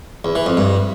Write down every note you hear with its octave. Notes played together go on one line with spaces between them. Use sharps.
E2
E3
F2
G2